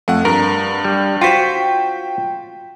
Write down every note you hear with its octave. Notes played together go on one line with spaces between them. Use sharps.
F2 A3 F#5
G2 A#4
G3
F4 F#4 C5 G5 B6